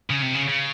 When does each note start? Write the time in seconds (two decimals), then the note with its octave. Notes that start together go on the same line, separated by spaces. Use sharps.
0.10 C#3
0.22 C3
0.35 C#3
0.48 C#3